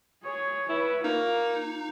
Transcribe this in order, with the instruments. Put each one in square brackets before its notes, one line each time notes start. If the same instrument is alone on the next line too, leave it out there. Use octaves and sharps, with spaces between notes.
[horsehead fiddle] G#4 C#5
[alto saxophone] E4 [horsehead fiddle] B4 C#5
[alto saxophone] A#3 [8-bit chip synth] D#4 [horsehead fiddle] F4